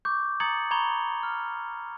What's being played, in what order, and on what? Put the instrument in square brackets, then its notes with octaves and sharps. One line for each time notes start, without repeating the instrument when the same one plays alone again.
[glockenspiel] C#6 D6 G6
A#5 D#6 G#6 A6 C#7 F#7
A#5 B5 C#6 G#6 F7 G7
F6